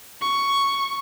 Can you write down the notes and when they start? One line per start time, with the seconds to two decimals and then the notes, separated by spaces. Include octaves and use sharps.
0.21 C#6